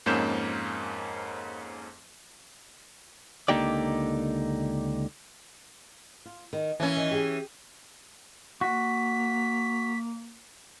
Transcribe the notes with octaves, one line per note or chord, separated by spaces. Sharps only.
F2 G#2 A#3 C#4 G6 E7
C#2 D3 A#3 D#4 G4 D5
F4
D#3
E3 A#3 C#4 C#5
D#3
G4 G#4 G#5
A#3 F#4 B6